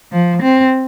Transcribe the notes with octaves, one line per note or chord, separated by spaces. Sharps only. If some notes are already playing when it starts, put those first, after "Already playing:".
F3
C4